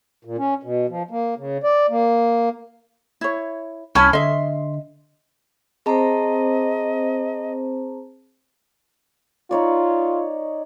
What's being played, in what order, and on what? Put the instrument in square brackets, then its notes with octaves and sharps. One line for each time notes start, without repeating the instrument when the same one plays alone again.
[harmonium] A#2
C#4
B2
F3
A#3
C#3
D5
A#3
[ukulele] E4 C#5
[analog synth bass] C2 [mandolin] C#4 E4 G#5 [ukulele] C#5 A5 B5
[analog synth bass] D3 [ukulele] D#5 E5 [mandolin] C6
[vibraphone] C4 C5 [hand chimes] G#4 A5 A#5 [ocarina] D#5
[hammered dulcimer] D#4 C#5 D5 [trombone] F4